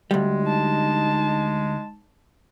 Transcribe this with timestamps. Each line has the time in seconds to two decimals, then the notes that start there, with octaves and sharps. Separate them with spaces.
0.11 D2 G3 G#3
0.43 D#4 A5